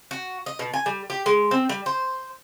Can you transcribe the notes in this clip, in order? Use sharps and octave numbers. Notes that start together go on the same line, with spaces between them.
F#4
D#5
B2
G#5
G3
G4
G#3
C4
G3
C5